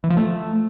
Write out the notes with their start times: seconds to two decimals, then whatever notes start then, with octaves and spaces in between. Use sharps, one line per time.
0.04 E3
0.10 F3
0.17 A3